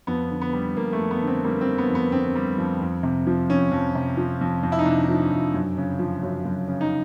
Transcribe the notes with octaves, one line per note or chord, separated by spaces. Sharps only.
F2 B3
D3
B3
G3
F2 A#3
A3
F2
B3
D3
C4
G3 A#3
C4
F2
B3
F2
B3
D3 C4
G3
F2
F2
C3
F3
F2 C#4
F2
C3
F3
F2
F2
E4
D#4
C3 D4
F3
F2
F#2
C#3
F3
F#2
F#2
C#3
D#4